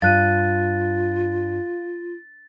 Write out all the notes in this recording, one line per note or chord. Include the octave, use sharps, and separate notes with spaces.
G2 F4 F5 F#6 A6 D#7